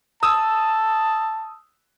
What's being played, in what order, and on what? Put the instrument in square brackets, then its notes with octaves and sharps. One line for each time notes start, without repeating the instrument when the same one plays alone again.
[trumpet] A5 [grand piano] D#6 E6